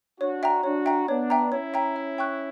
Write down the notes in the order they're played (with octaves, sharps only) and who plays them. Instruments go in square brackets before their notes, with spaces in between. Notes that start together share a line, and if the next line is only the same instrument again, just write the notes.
[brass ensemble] D4 F#4 [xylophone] C#5
[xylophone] E5 G5 A#5
[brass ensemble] D4 F#4 [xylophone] C#5
[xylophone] E5 G5 A#5
[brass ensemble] B3 D4 [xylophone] C#5
[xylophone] E5 G5 A#5
[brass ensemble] C#4 E4 [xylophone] C#5
[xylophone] E5 G5 A#5
E5
G5 C#6 F#6